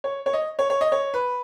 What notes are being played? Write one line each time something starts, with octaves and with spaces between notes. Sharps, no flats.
C#5
C#5
D#5
C#5
C#5
D#5
C#5
B4